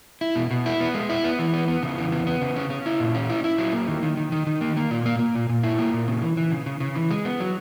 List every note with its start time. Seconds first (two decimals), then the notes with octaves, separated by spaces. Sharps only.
0.21 E4
0.36 B2
0.51 B2
0.66 E4
0.81 B3
0.94 G#3
1.10 E4
1.24 B3
1.39 E3
1.53 B3
1.68 B3
1.83 C#3
1.98 E3
2.12 B3
2.27 B3
2.42 C#3
2.56 C#4
2.70 C#4
2.86 E4
3.00 A#2
3.15 C#4
3.29 E4
3.44 E4
3.58 F#3
3.73 A#3
3.88 D#3
4.03 D#3
4.17 D#3
4.32 D#3
4.47 D#3
4.61 A#3
4.77 A#3
4.91 A#2
5.06 A#3
5.19 A#3
5.35 A#2
5.49 A#2
5.63 E4
5.79 A#3
5.94 A#2
6.08 C#3
6.22 E3
6.37 E3
6.52 C#3
6.66 C#3
6.80 C#3
6.96 E3
7.11 G#3
7.25 B3
7.40 F#3